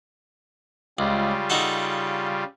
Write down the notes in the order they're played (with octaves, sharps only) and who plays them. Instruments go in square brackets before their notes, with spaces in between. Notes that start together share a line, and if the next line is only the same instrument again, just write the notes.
[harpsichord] C#2 [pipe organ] C#3 G3 F4
[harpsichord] D#4 F#4 A4